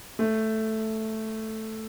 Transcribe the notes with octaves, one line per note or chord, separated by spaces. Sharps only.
A3